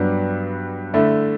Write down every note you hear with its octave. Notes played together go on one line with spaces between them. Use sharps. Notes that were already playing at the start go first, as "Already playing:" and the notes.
Already playing: G2 F#3 B3 D4
D3 A3 E4